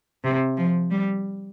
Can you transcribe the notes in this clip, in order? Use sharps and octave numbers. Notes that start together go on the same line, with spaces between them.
C3
F3
G3